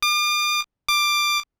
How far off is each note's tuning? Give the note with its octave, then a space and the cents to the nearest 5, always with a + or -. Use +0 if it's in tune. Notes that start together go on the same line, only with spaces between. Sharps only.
D6 +40
D6 +15